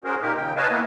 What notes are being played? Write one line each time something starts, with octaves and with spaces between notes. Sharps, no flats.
C#4 F#4 G#4 A#4 C5
A#2 A#3 D#4 G4 A#4
D#2 C#3 G5
B4 C#5 D#5 F5 G#5 A5
A#3 B3 E4